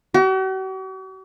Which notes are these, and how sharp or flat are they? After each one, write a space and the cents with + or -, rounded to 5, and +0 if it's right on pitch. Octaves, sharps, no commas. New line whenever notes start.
F#4 +45